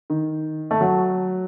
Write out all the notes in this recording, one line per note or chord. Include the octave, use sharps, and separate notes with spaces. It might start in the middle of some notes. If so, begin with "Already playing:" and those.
D#3
A3
F#3